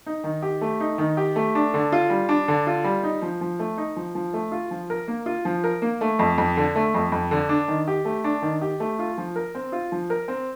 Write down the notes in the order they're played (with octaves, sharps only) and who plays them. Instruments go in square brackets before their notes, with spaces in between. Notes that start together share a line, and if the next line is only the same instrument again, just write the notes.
[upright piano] D#4
D#3
G4
A3
D#4
D#3
G4
A3
D4
D3
F4
G3
D4
D3
F4
G3
D#4
F3
F3
A3
D#4
F3
F3
A3
F4
F3
A#4
A#3
F4
F3
A#4
A#3
A3
F2
F2
D3
A3
F2
F2
D3
D4
D#3
G4
A3
D4
D#3
G4
A3
F4
F3
A#4
C4
F4
F3
A#4
C4